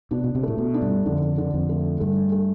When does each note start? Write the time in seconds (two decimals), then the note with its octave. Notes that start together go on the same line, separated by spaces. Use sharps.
0.11 B2 D4
0.24 B2
0.35 C3
0.43 A2 A3
0.58 B2
0.74 D4
0.82 G2
1.06 F2 D3
1.38 D3
1.54 F2
1.69 A3
2.00 G2 A3
2.32 A3